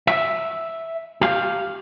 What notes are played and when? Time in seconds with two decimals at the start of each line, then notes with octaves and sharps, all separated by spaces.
0.07 E5
1.21 G4 F5